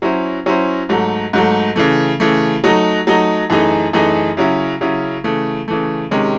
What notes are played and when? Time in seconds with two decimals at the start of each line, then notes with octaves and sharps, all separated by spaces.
0.02 F#3 C#4 E4 C5
0.46 F#3 C#4 E4 C5
0.89 G#2 F#3 A3
1.33 G#2 F#3 A3
1.76 C#3 E3 A3
2.20 C#3 E3 A3
2.64 F#3 A3 D#4
3.07 F#3 A3 D#4
3.50 F#2 E3 A3 D#4 G#4
3.93 F#2 E3 A3 D#4 G#4
4.37 C#3 F#3 C#4 E4
4.81 C#3 F#3 C#4 E4
5.24 C#3 E3 A3
5.68 C#3 E3 A3
6.11 C3 D#3 G#3 C#4